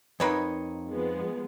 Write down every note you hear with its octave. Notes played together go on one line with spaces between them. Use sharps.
F2 A#3 D#4 B4 C#5
F3 G#3 B3